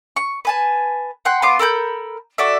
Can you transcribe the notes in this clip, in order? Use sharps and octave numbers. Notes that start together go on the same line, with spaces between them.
C#6
B4 G#5 A5
F#5 G5 C6 F#6
B3 F4 C6 D6
A4 A#4 B5 G6
F#4 A4 D5 E5